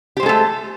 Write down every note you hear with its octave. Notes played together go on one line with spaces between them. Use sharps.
G#3 A3 G4 A4 C5